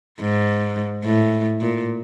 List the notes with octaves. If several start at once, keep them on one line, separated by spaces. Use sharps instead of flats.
G#2
A2
A#2